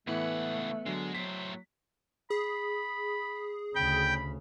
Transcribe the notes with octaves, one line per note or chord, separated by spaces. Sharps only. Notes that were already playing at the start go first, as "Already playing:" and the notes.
C#2 A2 E3 A3 B3 F#5
D3 F#3 G#3
A2 F#3 C5 B6
G#4 B5
D2 C#3 G5 B5